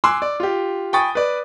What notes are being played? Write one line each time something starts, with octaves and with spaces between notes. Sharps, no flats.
G#5 C6 D6 E6 F#6
D5
F4 G4
G5 G#5 B5 C#6 D#6 A6
B4 D5